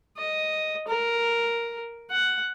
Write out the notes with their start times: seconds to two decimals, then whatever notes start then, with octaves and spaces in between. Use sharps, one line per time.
0.18 D#5
0.88 A#4
2.11 F#5